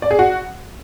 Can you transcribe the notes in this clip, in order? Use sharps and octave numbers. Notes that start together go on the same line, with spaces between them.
D5
G#4
F#4